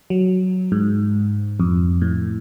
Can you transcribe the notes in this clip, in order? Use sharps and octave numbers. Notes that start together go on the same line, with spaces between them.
F#3
G#2
F2
A2